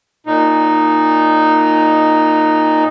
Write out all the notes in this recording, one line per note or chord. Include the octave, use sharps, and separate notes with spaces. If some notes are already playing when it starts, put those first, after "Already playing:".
A#2 D#4